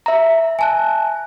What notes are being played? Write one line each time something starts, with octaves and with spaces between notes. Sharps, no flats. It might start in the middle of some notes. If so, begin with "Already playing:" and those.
E5 A#5
G#5 A5 F#6